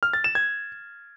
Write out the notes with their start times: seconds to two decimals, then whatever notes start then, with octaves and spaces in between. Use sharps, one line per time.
0.03 F6
0.13 A6
0.24 E7
0.35 G#6